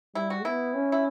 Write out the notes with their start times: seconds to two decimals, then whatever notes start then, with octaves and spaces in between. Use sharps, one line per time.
0.15 G3 E4
0.30 F#4
0.45 B3 E4
0.74 C#4
0.92 E4